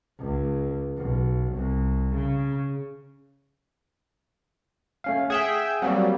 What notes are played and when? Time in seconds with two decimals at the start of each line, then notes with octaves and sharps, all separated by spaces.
0.19 C#2
0.97 B1
1.53 C2
2.15 C#3
5.04 A3 C#4 F5
5.30 G#4 E5 F#5 G5 D#6
5.82 F#3 G3 A#3 C4